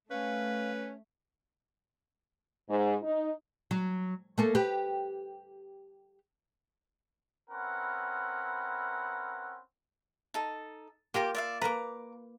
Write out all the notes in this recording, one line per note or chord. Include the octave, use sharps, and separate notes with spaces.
A3 C#4 B4 F5
G#2
D#4
F#3
A3 A#3 A4
G4 B4
C4 C#4 E4 A#4 B4 F#5
D#4 A4
A#3 F4 G4 A#4 D6
D5 E5 F5
A#3 B4 A#5 D6